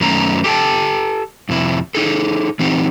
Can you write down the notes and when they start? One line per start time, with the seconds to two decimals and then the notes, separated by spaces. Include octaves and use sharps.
0.01 F#2 D#3 A3 C#4 A#5
0.44 G4 A4 G5 A5
1.49 F2 C3 E4
1.95 D#4 G#4 A4
2.59 E3 C4 D#4 G4